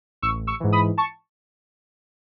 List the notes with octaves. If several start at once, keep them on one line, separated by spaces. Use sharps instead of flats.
A1 C#6 E6
C#6 E6
G#2 E3
B5 D#6
A5 C#6